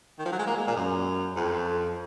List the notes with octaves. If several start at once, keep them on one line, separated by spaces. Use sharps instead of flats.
D#3
F3
F#3
G#3
A#3
G#3
A#2
F#2
F2